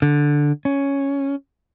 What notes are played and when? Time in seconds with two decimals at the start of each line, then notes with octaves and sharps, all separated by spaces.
0.02 D3
0.65 C#4